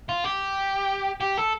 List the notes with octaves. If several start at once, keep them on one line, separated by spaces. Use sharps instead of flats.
F4
G4
G4
A4